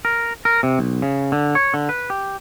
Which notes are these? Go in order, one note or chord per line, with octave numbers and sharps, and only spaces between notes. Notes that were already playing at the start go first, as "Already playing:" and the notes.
A#4
A#4
C3
B1
C#3
D3
C#5
D3
B4
G4